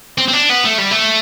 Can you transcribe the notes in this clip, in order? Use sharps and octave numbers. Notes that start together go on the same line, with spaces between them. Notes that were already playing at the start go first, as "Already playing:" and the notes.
C4
C4
D4
B3
A3
G3
A3